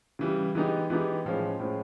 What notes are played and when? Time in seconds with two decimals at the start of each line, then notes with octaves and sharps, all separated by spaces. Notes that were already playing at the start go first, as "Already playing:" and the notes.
0.19 C#3 E3 G3
0.55 E3 G#3 B3 D#4 G4
0.90 E3 G#3 B3 D#4 G4
1.25 A2 F3 G#3 C#4
1.59 A2 F3 G#3 C#4